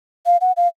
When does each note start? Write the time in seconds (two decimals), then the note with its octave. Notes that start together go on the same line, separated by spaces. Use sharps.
0.26 F5
0.41 F#5
0.57 F5